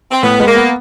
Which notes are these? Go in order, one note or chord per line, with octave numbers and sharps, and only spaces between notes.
C4
A2 B3
G#3
A#3
B3